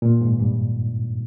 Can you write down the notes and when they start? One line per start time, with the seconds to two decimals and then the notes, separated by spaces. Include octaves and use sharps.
0.02 A#2
0.21 G#2
0.39 G2